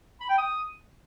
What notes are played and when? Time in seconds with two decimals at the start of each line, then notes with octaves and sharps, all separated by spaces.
0.20 B5
0.29 G5
0.38 D#6